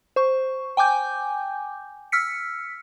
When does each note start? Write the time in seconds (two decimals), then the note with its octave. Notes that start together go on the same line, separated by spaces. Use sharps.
0.16 C5 C#6
0.77 G5 G#5 D6 G6
2.12 E6 F6 B6 C#7